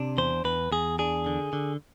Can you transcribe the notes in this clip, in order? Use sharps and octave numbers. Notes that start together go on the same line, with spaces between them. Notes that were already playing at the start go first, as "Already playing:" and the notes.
Already playing: C3 D4
E2 C5
E2 B4
E2 G#4
D4 G#4
D3
D3